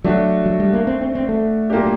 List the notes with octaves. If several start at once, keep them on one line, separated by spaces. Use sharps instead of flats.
F#3 A3 D4 F#4
F#3
G3
A#3
C4
C4
C4
A3
A#2 F#3 A#3 D4 G4